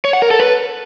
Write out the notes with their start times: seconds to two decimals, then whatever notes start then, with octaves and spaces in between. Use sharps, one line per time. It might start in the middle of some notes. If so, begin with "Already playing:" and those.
0.05 C#5
0.13 F#5
0.22 A#4
0.31 A4
0.40 B4